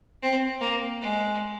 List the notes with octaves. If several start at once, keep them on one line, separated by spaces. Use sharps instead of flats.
C4
A#3
G#3